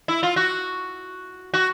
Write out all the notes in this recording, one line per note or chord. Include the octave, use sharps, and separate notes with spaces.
E4
F4
F#4
F#4